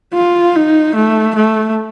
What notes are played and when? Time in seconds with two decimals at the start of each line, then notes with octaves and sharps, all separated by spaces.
0.14 F4
0.55 D#4
0.95 A3
1.35 A3